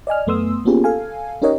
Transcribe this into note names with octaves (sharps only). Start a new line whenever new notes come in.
D5 D#5 G#5 F6
F#2 A3 B3 C6 D#6 E6
A#3 B3 C#4 F4 G4 G#4
A4 F5 G#5
C#4 D#4 G4 A#4 C#5 D#5